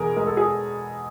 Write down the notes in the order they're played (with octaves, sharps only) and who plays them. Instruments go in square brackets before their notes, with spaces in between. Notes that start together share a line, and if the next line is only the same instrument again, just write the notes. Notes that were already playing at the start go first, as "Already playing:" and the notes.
Already playing: [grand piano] E2 B2 G#4 A#4
G#3 A#4
A4
G#4